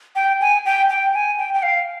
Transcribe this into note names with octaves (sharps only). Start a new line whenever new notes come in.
G5
G#5
G5
G5
G#5
G5
G5
F5